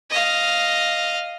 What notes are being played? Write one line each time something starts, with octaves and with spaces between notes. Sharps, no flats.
D#5 F5